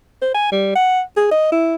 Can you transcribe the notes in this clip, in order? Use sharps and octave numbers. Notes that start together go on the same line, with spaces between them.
C5
G#5
G3
F#5
G#4
D#5
E4